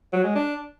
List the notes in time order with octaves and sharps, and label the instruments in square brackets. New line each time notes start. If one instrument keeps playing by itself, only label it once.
[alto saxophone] F#3
G#3
D4